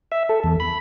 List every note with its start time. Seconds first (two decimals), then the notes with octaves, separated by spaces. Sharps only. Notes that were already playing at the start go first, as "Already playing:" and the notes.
0.12 E5
0.29 A4
0.44 E2
0.60 B5